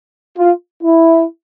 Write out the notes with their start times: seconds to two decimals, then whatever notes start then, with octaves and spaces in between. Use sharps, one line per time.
0.38 F4
0.83 E4